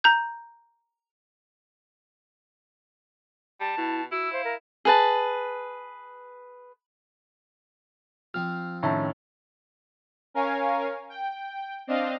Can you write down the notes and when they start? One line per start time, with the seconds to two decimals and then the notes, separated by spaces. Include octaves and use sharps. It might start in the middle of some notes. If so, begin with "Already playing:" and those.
0.04 A#5 G6
3.60 G3 A5
3.78 B2 E4
4.11 E4 F#4 E6
4.33 C5 F5
4.44 A#4
4.85 G#4 B4 A5
8.34 F3 C4 F6
8.83 A2 D#3 C#4 C#5 E5 A5
10.34 C#4 A#4 C#5 F5 G#5
11.10 G5
11.87 C4 D4 D#5 F5